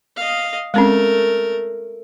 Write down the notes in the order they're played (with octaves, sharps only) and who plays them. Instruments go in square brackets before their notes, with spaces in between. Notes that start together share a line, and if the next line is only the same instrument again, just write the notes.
[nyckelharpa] D#5 F5
[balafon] G#3 C4 C#4 [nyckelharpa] A3 A#4